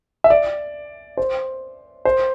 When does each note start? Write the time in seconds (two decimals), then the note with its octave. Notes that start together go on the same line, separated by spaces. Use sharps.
0.24 E5
0.30 D5
1.17 C5
2.05 C5